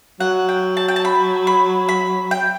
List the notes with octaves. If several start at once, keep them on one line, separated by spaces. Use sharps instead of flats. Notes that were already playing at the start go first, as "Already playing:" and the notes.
F#3 F#5
G5
A5
G5
A5
B5
B5
B5
G5